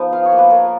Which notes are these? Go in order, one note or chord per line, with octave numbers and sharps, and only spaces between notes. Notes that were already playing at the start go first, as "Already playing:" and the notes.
Already playing: F3 G#3 B3 D#4
F4 F5
C#5
A#3
B4
F4 A#4